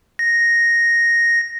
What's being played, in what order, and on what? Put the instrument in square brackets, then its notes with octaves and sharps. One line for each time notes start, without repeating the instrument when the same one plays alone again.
[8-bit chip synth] A#6